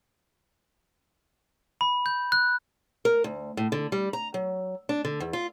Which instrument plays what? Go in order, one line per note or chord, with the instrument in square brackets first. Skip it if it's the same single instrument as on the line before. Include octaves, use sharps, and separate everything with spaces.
[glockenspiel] B5
G6
F#6
[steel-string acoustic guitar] A#4
D2
A2
D3
G3
A#5
F#3
D4
D3
E2
F4